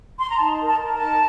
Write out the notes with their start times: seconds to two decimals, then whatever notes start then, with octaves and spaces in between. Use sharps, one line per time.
0.19 C6
0.30 A#5
0.40 D#4 A5
0.61 A#4
0.68 A5
0.81 A#4
0.94 A5
1.01 D#4